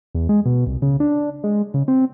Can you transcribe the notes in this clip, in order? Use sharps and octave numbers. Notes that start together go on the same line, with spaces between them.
E2
G#3
B2
C2
C#3
D4
G#3
C#3
C4